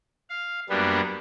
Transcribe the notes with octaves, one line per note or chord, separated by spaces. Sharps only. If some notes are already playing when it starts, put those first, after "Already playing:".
F5
F#2 G3 A#3 B3 D4